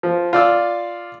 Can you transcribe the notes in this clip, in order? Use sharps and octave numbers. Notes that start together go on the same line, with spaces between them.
F3
F4 D5 E6